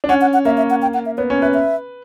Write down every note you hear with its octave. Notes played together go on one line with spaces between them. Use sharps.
D4
C#4 F#5
F#5
F#5
A#3 E5
E5
F#5
G5
F#5
E5
B3 C#5
C#4
B4 E5
E5